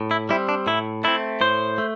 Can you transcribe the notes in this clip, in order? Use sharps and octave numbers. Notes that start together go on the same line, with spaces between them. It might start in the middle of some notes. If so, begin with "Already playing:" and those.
Already playing: A2
E4
G3 C4 E4
D4
A2 E4
A3 C4 E4
A2 C5
A3